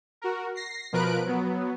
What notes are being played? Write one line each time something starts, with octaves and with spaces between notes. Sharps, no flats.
F#4 A#4
A#6 C7
B2 F3 A#4 B4 F#6 D7
F#3 B3